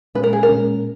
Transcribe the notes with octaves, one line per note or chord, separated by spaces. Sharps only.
A#2 G#3 C#4 B4
A#4
G#4
A#4
A#2 G#3 C#4